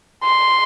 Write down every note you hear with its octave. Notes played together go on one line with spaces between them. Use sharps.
C6